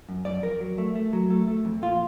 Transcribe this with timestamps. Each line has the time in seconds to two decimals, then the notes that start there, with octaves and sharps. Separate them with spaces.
0.09 F#2
0.25 F#2 D5
0.42 F2 A#4
0.60 F#3
0.78 A3
0.95 A3
1.13 F#3
1.30 A3
1.48 A3
1.65 F2
1.82 A#2 F4